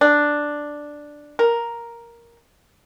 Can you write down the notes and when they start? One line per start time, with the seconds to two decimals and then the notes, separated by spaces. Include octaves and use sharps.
0.01 D4
1.39 A#4